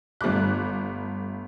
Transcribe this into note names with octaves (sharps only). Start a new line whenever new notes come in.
G1 G3 A3 D6 F#6